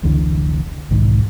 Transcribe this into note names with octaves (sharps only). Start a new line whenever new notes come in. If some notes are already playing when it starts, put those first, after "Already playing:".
F1 C#2 D3 E3
E1 B1 G#2 D#3